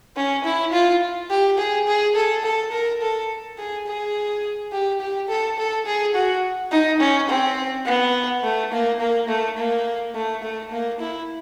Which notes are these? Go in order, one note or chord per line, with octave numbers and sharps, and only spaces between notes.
C#4
E4
F4
G4
G#4
G#4
A4
A4
A#4
A4
G#4
G#4
G4
G4
A4
A4
G#4
F#4
D#4
C#4
C4
B3
A3
A#3
A#3
A3
A#3
A3
A3
A#3
E4